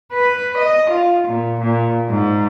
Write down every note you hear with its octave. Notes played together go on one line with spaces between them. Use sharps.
B4
D#5
F4
A#2
A#2
G#2